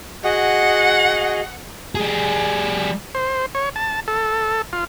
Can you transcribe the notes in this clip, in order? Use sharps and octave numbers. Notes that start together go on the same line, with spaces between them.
F#4 G#4 D#5 F#5
G3 G#4
C5
C#5
A5
A4
F4